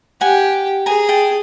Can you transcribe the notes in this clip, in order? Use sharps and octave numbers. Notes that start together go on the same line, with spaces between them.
G4 F#5 G#5
G#4 G#5 A#5
G5 A5